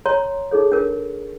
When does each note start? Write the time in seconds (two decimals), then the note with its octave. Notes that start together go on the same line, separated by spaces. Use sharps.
0.06 C#5 A#5 C6
0.51 D#4 G#4 A4 C#5
0.72 D4 A#4